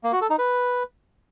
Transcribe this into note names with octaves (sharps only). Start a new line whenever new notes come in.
A#3
F#4
A4
D#4
B4